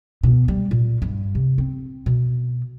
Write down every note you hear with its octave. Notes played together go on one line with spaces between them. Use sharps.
B2
G3
A#2
G2
C3
C4
B2